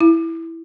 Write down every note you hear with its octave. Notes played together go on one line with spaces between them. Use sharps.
E4